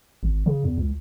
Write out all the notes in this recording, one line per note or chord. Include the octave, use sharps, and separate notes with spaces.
G#1
C#3
E2
C#2